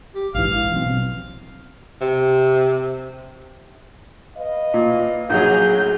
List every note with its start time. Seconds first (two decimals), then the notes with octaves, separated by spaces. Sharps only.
0.15 G4
0.35 A#1 G#2 E3 F5
0.73 B2 F#3 C4
2.01 C3
4.37 B4 D#5 F5
4.74 A#2
5.30 A#1 F#3 G#4 G6
5.66 A2